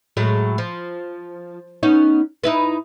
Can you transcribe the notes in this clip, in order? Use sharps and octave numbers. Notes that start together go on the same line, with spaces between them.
A2 F#3 G#3
F3
B3 C#4 D#4
D#4 E4 B4